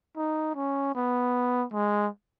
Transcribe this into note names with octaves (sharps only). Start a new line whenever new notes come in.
D#4
C#4
B3
G#3